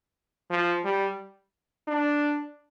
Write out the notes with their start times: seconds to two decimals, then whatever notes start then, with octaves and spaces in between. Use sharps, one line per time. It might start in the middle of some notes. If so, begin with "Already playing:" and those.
0.50 F3
0.84 G3
1.88 D4